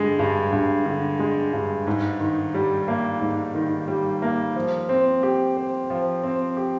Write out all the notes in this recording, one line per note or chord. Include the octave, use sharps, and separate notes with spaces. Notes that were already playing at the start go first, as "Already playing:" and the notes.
Already playing: G2 D3 G#3
G2
G2
D3
G#3
G2
G#2
D#3
G3
A#3
G#2
D#3
G3
A#3
F3
C4
G4
C5
F3
C4
G4